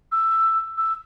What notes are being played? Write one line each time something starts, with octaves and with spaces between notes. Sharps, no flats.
E6
E6